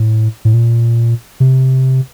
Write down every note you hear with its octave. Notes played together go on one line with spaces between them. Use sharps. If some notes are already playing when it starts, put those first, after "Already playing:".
Already playing: A2
A2
A#2
C3